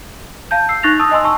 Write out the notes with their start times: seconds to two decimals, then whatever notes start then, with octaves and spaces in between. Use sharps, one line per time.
0.51 F5 A5 G6
0.69 E6 C7
0.83 D#4 C#6 F#6 A6 A#6 F7
1.00 A5 D#6 E6
1.11 D#5 G#5 C6 E6
1.24 A5 C#6 E6